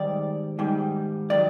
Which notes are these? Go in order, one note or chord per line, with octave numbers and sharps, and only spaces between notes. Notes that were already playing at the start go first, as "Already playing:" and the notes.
Already playing: G#2 D#3 G3 D5
G#2 D#3 G3
D#3 F#3 D5